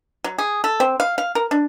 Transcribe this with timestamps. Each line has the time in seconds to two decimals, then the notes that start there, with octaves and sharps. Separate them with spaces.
0.24 F#3
0.38 G#4
0.64 A4
0.80 C4
1.00 F5
1.18 F5
1.35 A#4
1.51 D4